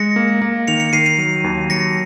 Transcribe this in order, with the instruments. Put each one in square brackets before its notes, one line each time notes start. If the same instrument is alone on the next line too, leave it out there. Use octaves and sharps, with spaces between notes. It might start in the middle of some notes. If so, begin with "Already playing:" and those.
Already playing: [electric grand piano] G#3 [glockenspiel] A#6 C#7
[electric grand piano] A#3
A#3
[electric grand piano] D#3 [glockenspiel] C#7 F7
[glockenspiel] C#7 F7
[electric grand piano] D#3 [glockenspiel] C7 D#7
[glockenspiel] C7 D#7
[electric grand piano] F#3
D#2
[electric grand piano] F#3 [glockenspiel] A#6 C#7